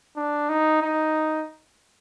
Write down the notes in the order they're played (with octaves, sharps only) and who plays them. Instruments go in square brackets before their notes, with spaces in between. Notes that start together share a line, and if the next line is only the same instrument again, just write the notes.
[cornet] D4
D#4
D#4